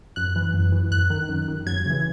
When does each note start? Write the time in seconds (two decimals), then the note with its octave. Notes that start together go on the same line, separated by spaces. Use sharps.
0.16 F#2 F#6
0.36 E3
0.54 F#2
0.72 E3
0.91 F#2 F#6
1.10 D#3
1.29 F#2
1.48 D#3
1.66 F#2 G#6
1.86 C#3 E3